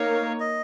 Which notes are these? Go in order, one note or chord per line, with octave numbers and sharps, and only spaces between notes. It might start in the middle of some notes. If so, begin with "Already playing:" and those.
Already playing: A#3 D#4 A#4 C#5 F5
D#5